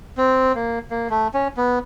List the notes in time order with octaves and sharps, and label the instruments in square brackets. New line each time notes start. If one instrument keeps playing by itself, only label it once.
[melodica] C4
A#3
A#3
A3
C#4
B3